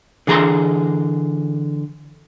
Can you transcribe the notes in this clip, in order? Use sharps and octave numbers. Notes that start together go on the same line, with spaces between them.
D3 E3 G#4 A5 A#5 C6